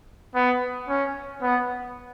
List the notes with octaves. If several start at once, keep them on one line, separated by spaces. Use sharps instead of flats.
B3
C#4
B3